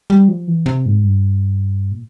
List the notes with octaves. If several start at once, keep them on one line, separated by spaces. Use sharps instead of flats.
G3
F3
E3
C3
G#2
G2
A#2